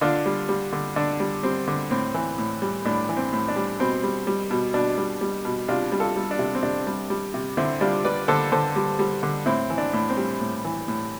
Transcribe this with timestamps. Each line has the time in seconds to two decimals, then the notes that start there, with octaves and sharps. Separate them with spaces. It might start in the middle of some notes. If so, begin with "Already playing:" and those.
0.01 D3 D4 F4
0.26 G3
0.49 G3
0.73 D3
0.96 D3 D4
1.20 G3
1.43 G3 C4
1.68 D3
1.91 A2 C4
2.14 E3
2.38 A2
2.62 G3
2.85 A2 D4
3.09 E3
3.17 C4
3.33 A2
3.48 D4
3.56 G3
3.80 B2 C4
4.03 G3
4.27 G3
4.50 B2
4.74 B2 D4
4.98 G3
5.21 G3
5.45 B2
5.68 C3 D4 F4
5.92 G3
6.00 F4 A4
6.16 G3
6.31 D4
6.39 C3
6.55 C4
6.63 C3 D4
6.87 G3
7.10 G3
7.34 C3
7.57 D3 C4 E4
7.81 G3 D4 F4
8.04 G3 B4 D5
8.28 D3 A4 C5
8.52 D3 A4 C5
8.76 G3
8.99 G3
9.23 D3
9.46 A2 C4 E4
9.70 E3
9.78 D4
9.93 A2
10.10 C4
10.17 G3
10.40 A2
10.64 E3
10.88 A2